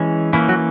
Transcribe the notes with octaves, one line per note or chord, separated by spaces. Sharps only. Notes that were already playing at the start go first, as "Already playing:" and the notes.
Already playing: E3 G#3 C#4
E3 A#3 C#4 E4
F#3 F#4